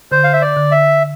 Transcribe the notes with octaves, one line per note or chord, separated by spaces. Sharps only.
D3 C5
F5
E5
D5
D3
E5